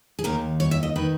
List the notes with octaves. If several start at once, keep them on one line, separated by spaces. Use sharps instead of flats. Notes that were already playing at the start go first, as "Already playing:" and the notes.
G#4
D#2 D#3 A#4
C#5
E5
D#5
D#3 B4